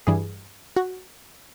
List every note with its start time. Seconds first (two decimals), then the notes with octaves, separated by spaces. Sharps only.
0.07 G2 E3 G3 G#4
0.76 F#4